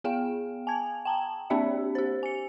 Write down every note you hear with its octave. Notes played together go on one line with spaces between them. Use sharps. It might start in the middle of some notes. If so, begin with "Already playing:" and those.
B3 G#4 F5 G5
G#5 A5 G#6
G5 A5 A#5
A#3 C4 D4 G4 D5 E5
G4 C5
G#5 C#7